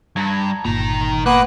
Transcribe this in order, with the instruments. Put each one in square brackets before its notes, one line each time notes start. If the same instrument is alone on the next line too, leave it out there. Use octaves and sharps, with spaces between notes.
[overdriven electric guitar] G2 [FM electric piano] A5 A#5 G#6
[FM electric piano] G1 A#2 [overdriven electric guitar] D#3 A#5
[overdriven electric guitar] A#3 [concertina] B3 B4 F#6